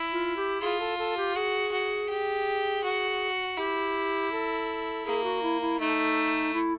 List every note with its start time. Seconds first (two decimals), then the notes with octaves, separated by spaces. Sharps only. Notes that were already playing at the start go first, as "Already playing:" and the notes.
Already playing: E4
0.12 F4
0.36 G4
0.61 F4 G#4
0.79 A4
0.98 A4
1.17 G4
1.35 F#4 G#4
1.72 F#4
2.09 G4
2.83 F#4
3.57 E4 G4
4.31 A4
5.05 A#3 G#4
5.23 F#4
5.42 E4
5.61 E4
5.79 A3 D#4
6.53 E4